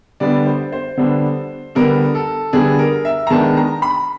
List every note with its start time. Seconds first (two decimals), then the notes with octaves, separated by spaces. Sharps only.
0.20 D3 G3 B3 D4 D5
0.46 C5
0.72 C5
0.97 D3 G3 B3 D4
1.75 D3 G3 B3 D4 A#4
2.15 A4
2.53 D3 G3 B3 D4 G#4
2.79 A#4
3.05 E5
3.27 A#5
3.30 D#3 G#3 B3 D4 A5
3.57 A#5
3.82 B5